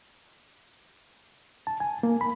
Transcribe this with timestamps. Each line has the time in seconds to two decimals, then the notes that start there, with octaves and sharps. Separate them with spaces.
1.67 A5
1.80 G#5
2.03 A#3
2.21 B5